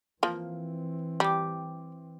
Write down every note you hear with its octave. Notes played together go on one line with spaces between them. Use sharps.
E3 F3 A#3 C4
G3 G5 D6